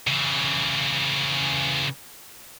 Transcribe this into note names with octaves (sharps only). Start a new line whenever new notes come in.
C#3 E3